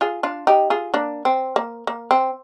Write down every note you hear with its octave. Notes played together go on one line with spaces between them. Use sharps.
F4 G#4
D4 F4
D#4 G4
F4 G#4
A#3 D4
C4
A#3
A#3
C4